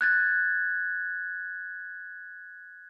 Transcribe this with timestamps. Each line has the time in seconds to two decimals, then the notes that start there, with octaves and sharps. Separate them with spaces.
0.01 F#6 G#6 A6